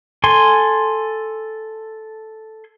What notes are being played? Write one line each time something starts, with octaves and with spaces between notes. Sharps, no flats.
A4 G#5 C6